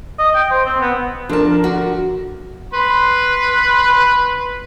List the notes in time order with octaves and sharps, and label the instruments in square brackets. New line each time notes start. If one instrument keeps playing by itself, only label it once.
[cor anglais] D#5
G5
C5
C4
B3
[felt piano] F3 A4 A#4 [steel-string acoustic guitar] D4 A5
[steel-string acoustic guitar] D3 F#4
[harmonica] B4 B5 C6